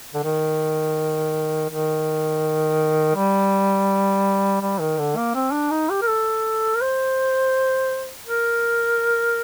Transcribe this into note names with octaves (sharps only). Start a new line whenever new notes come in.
D3
D#3
D#3
G3
G3
D#3
D3
A#3
C4
D4
D#4
G4
A#4
A4
A#4
C5
A#4